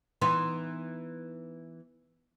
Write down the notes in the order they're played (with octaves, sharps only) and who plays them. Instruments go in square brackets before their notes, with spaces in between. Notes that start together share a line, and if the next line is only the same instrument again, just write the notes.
[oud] E3 B3 D#4 [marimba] C6